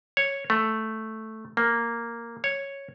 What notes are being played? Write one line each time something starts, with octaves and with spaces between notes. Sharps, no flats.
C#5
A3
A#3
C#5